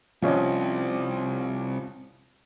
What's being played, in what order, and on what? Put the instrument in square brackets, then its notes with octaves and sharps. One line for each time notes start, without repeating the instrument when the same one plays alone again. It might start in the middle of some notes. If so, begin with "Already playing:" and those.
[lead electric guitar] C2 [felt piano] F3 C#4 D#5